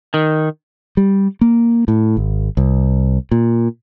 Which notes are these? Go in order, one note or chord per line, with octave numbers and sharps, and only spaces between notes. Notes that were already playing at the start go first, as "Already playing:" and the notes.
D#3
G3
A#3
A2
G#1
C2
A#2